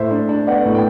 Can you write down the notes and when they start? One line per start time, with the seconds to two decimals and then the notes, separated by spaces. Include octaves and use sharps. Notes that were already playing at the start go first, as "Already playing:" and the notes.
Already playing: A2 C5 E5
0.11 D4
0.29 D4
0.47 B3 D5 F#5
0.65 A2
0.75 G5